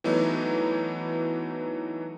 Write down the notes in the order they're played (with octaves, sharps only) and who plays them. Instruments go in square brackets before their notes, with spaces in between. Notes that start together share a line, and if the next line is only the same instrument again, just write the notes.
[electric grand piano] E3 F#3 A3 B3 D#4